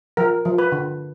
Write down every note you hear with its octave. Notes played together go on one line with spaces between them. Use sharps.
F3 A#4
F3
B4
D3